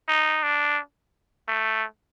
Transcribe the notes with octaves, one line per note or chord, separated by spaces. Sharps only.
D#4
D4
A3